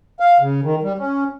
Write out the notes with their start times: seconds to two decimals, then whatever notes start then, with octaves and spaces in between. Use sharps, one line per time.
0.20 F5
0.40 C#3
0.64 D#3
0.83 G3
0.98 C#4